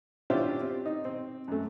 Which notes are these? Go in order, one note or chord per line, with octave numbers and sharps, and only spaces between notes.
C#4 D4 E4 F4 G4 C5
C4
D#4
C4
F#2 A3